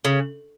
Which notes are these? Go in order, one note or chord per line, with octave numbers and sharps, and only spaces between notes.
C#3